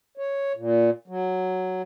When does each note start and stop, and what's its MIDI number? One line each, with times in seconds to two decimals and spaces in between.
0.18 0.52 73
0.56 0.90 46
1.08 1.82 54